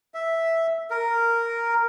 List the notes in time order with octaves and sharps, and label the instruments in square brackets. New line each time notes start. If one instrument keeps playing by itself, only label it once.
[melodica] E5
A#4